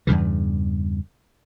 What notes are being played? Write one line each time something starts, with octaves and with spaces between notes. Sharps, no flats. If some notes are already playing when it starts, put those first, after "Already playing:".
E2 G2 C#3 E3